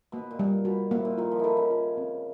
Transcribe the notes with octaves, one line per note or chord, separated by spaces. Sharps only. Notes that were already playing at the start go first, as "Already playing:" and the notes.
B2 A#3
A#2
G3
B2 F#4
A2 A#3
A#2
D#3 F4
F3
D#3 E3 A4
C#3
F4
C4